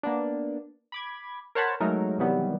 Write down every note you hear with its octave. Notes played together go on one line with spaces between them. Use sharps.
A#3 B3 D4
B5 D6 G#6
A#4 C5 C#5 F#5 A5 B5
F#3 G#3 A3 D#4 A#4
C3 D#3 E3 F#3 G3 B3